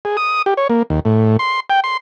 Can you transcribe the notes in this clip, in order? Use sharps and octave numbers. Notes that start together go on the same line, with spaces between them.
G#4
D#6
G4
C#5
A#3
D#2
A2
C6
G5
C6